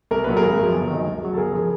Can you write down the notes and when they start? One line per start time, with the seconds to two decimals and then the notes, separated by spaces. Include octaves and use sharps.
0.11 C2 A#4
0.24 A#2 F#3 B4
0.37 G#4 A#4
0.43 G#1
0.59 F#2 C#3 F3
0.74 G1
0.90 F#2 D#3
1.06 D2
1.22 C#3 F#3
1.33 A4
1.37 G1 G#4 A#4
1.53 C#3 F3